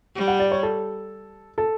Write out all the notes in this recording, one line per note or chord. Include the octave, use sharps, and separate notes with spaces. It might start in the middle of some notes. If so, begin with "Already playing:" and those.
G3
F#5
D5
C#5
A4
A4